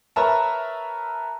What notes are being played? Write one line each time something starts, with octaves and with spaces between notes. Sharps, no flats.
A#4 B4 C#5 E5 A5 A#5